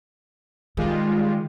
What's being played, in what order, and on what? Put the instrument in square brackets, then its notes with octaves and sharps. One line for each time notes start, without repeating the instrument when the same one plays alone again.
[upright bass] D#3 [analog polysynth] G3 G#3 F4